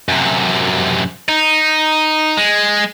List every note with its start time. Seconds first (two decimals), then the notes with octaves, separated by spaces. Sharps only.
0.09 F#2 C3
1.29 D#4
2.37 G#3